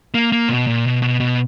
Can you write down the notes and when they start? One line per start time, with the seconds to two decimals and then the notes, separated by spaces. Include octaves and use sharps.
0.14 A#3
0.32 A#3
0.49 B2
0.67 A#2
0.85 B2
1.02 B2
1.20 B2